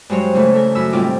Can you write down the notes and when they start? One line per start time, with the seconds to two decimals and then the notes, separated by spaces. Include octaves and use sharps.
0.10 G2 F#3 G#3 C5 C#5
0.34 C#3 E3 A3
0.53 A3 A4 A#4
0.75 F#2 B5 E6
0.92 A2 D#3 G3 C4 F4 D6